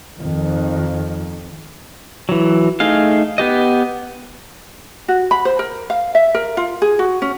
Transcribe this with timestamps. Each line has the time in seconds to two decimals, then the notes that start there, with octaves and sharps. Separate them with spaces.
0.19 F2 D#3
2.29 E3 F#3
2.80 A3 D#4 G#4 F5
3.38 B3 G4 D#5
5.08 F#4
5.31 B5
5.45 C5
5.59 A#4
5.90 F5
6.15 E5
6.35 A#4
6.57 F4
6.82 G#4
6.99 F#4
7.22 C#4